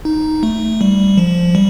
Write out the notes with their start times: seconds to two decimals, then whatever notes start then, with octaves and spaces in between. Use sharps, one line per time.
0.05 D#4
0.43 A3
0.81 G3
1.17 F3
1.55 G3